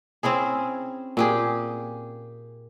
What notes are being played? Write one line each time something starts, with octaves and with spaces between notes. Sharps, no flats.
C4 C#4 E4 G#4
A#2 G4 G#4